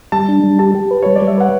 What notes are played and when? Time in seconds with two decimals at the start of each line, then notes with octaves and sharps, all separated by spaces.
0.12 G3 A5
0.28 D4
0.44 G3
0.59 G4 A5
0.75 G4
0.91 B4
1.02 G3 C#5
1.16 D5
1.22 G3
1.27 E5
1.37 B4 F#5